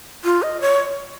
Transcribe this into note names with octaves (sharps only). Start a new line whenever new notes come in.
F4
D#5
C#5